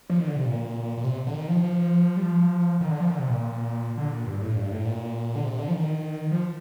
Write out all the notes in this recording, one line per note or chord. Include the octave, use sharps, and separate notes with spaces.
F3
D#3
D3
C3
A#2
A#2
C3
D3
D#3
F3
F3
G3
F3
D#3
D3
F3
D#3
D3
C3
A#2
D3
A#2
G2
A2
G2
A2
A#2
D3
C3
D3
F3
D#3
F3